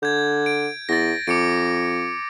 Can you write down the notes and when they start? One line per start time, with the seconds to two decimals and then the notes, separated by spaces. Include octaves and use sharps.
0.03 D3 G6 G#6
0.46 D7
0.89 E2 A6 A#6
1.27 F2 D6 C#7 D7